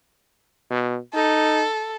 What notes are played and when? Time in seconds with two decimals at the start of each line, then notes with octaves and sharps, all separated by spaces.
0.71 B2
1.14 D#4 A4